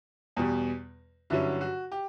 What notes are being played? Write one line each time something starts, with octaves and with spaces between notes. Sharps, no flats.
E2 B2 G3
G2 D3 F#3 C#4 E4
F#4
G4